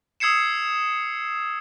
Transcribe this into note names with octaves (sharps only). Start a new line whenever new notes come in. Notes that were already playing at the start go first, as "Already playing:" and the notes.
D#6 E6 G#6 C7 C#7 E7